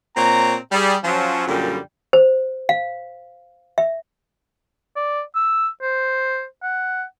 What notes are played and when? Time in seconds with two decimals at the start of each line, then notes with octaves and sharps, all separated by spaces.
0.16 A#2 C4 C#5 A#5
0.72 G3 G#4
1.04 F3 F#3 C#4
1.47 F#2 A#2 D3 G3
2.13 C5
2.69 F5
3.78 E5
4.96 D5
5.35 E6
5.82 C5
6.63 F#5